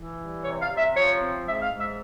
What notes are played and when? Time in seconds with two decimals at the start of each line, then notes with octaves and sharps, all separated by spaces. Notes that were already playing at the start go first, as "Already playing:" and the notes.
Already playing: E3
0.19 G3
0.43 C3 C#5
0.61 F5
0.69 C3
0.77 E5
0.94 F3 C#5
1.20 C4
1.46 G#2 E5
1.62 F5
1.71 G#2
1.79 E5